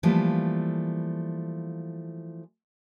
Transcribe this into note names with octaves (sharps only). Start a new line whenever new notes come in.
E3 F3 G3 A3 A#3